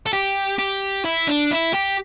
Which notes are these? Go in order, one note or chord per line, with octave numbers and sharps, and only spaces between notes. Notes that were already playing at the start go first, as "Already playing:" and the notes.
A4
G4
G4
E4
D4
E4
G4